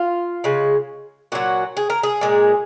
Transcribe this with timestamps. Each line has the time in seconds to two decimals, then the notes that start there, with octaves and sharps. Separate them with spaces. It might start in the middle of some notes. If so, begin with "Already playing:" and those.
Already playing: F4
0.44 C#3 G#3
1.32 A#2 F#3 F#4
1.77 G#4
1.90 A#4
2.03 G#4
2.21 A#2 G#3